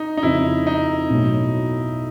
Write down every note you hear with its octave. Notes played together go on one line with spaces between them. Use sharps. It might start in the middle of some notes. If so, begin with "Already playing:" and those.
Already playing: D#4
D#4
F2 C#3 F3 E4
D#4
B1 A2 F#3